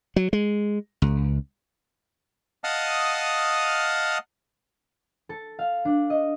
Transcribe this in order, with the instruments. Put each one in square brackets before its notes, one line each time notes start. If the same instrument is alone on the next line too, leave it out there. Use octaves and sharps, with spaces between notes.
[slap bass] F#3
G#3
C#2
[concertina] D#5 F5 F#5 A5 D#6 F6
[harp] A4
F5
D4
D#5